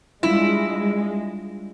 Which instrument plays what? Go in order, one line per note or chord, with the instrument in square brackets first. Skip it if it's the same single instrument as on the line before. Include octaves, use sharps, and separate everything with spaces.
[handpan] G3 D4 F4 [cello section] G#3 [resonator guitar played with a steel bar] E4